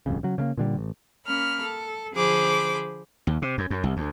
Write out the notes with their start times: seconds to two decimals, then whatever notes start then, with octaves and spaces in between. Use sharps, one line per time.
0.06 D1 C2 F2 C#3
0.23 C#3 F#3
0.38 C#3 A3 A#3
0.57 A#2 D3 G3
0.77 A1
1.26 A#3 C#4 B5 F6
1.61 A4
2.14 D3 F3 G#4 C5 B5 D6
3.27 D#2
3.42 C3
3.58 F#2
3.70 F#2
3.84 C2
3.97 D2